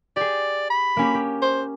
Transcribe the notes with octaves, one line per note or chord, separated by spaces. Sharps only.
G4 G#4 D5
B5
A#3 C#4 G4
G4
C5